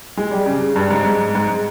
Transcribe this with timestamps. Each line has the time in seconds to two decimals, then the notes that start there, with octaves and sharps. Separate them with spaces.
0.17 G#3
0.31 G3
0.46 C#3
0.61 C#3
0.76 G2
0.91 G#2
1.05 G#2
1.35 G#2